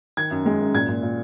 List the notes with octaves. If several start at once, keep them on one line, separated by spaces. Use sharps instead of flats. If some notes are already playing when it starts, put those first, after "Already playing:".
D#3 G#6
F#2
G#3
F#2
A#2 G#6
A#2
A#2